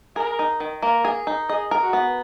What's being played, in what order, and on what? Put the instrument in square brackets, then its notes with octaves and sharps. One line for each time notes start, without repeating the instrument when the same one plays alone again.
[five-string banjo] G#4 [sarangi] A#4
[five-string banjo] D#4
D#3
[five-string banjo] A#3 [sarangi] A#4
[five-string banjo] G#4
D#4
[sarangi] G#4 [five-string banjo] D#5
[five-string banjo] A#4
[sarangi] F#4
[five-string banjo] B3